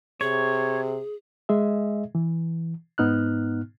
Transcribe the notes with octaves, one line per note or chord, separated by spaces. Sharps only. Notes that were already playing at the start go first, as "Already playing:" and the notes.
C3 G#4 C#5
G#3 G#4 D#5 E5
E3
G#2 B3 D#4 F6 F#6